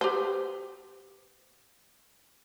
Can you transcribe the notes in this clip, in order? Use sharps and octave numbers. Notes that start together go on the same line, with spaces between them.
G4 B4 C5